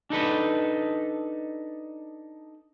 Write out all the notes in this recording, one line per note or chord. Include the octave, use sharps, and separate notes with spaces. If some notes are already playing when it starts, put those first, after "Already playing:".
D4 D#4 A4 B4